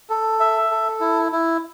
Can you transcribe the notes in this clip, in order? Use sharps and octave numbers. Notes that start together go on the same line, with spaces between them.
A4
E5
A4
E4
E4